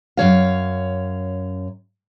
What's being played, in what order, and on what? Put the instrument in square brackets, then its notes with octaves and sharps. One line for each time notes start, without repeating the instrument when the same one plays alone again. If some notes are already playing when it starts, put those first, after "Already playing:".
[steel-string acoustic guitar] F#2 F3 C#5 F5